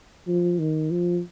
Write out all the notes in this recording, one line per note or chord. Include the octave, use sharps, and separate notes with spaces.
F3
D#3
F3